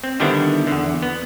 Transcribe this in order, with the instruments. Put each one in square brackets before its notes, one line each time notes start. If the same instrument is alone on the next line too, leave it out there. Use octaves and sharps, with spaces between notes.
[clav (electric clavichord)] C4
D3 D#3 G3 B3 D4 E4
E2 D3
B3